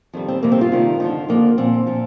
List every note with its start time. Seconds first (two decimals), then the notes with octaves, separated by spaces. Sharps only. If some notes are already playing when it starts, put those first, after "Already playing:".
0.14 F2 D#3 G3
0.28 C4
0.43 F2 C3 D#3 G3 A#3
0.52 C4
0.61 F4
0.72 F2 C3 D#3 G3
1.00 F2 D3 F3 D#4
1.29 F2 D3 F3 A#3
1.57 A#2 F3 C4
1.87 A#2 F3